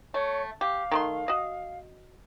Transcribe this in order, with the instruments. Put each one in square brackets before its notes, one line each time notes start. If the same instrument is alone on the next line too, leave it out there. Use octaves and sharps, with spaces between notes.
[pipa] A3 [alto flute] C#5
[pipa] G4 [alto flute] F5
[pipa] D#3 A3 C6
F#4 D#5